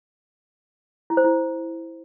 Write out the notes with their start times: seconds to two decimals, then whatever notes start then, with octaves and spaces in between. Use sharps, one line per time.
1.10 E4
1.17 C5
1.24 E4